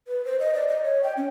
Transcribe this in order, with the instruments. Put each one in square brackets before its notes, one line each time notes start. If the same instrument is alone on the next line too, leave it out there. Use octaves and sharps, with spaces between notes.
[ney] B4
C5
D#5
D5
D#5
C#5
G5
C#4